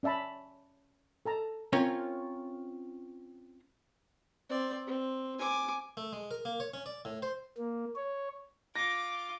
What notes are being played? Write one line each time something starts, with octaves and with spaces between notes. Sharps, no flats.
C#4 D5 E5 A5 B5
A4 A5 A#5
C4 C#4 F4 A#4 C#5
C4 D5
C4
G#5 D6
A3
G#3
A#4
A#3
C#5
C#4
D5
A2
C5
A#3
C#5
F4 D6 A#6